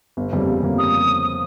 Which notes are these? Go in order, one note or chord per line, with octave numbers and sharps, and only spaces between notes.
G1
F2 C#3 G3 A#3
G1
F2 C#3 G3 A#3
D#6